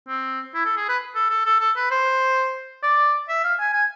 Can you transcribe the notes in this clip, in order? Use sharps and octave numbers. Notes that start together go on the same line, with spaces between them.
C4
E4
A4
G#4
B4
A4
A4
A4
A4
B4
C5
D5
E5
F5
G#5
G#5